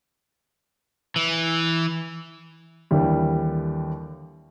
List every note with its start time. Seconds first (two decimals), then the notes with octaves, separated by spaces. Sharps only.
1.16 E3
2.91 D#2 D3 E3 G3